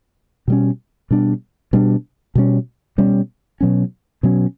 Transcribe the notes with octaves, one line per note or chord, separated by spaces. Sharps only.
B2 G3 C#4
B2 G3 D4
B2 G3 D4
B2 G3 C#4
B2 G3 C#4
B2 F#3 C#4
B2 F#3 C#4